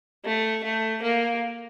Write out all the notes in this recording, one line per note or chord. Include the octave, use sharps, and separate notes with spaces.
A3
A3
A#3